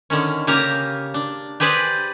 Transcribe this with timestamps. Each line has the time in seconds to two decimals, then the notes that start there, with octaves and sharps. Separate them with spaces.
0.10 D3 D#3 C#4
0.47 C#3 A#3 G4 F5 G#5 A#5
1.14 D4
1.60 G4 G#4 B4 C5 D5